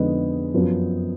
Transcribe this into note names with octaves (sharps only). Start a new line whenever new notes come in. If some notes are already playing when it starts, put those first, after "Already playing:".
Already playing: F2 D3 G#3 B3 D#4
F#2 F3 B3